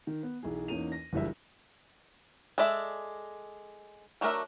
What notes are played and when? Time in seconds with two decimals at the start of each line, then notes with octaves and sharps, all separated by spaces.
0.07 D#3
0.23 B3
0.43 B1 E3 G#4
0.68 E2 A#3 C#4 D#4 D#7 F7
0.92 A#6
1.13 F#1 C#2 E3 G3 D4 E5
2.58 G#3 A4 D5 E5
4.21 F#3 A3 D4 A#4 E5